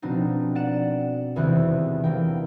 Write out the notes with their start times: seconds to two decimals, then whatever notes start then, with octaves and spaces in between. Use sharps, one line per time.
0.02 B2 F3 C4 D4 D#4
0.55 D5 F#5 E7
1.36 G#1 E2 C3 E3 F#6
2.04 E3 A#3 G5